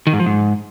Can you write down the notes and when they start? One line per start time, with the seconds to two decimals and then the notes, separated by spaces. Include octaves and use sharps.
0.07 D#3
0.13 G#2
0.20 F3
0.26 G#2